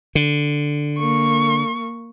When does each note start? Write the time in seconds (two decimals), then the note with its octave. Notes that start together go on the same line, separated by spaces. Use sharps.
0.15 D3
0.99 A#3 C#6